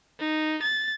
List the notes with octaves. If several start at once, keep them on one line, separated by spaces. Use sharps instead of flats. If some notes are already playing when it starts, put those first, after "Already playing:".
D#4
A6